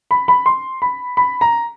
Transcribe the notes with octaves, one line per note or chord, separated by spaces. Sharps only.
B5
B5
C6
B5
B5
A#5